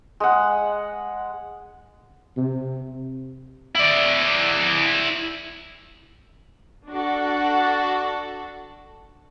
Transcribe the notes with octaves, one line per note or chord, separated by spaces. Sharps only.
G#3 F#5
C3
E4 D5
D4 F#4 A4